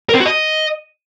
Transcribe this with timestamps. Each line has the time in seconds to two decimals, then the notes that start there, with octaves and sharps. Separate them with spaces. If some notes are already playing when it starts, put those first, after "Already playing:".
0.09 A#4
0.15 C4
0.20 F#4
0.26 D#5